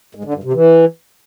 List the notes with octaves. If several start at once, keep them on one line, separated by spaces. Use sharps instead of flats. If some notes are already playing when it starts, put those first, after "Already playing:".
G#2
D3
G2
C3
E3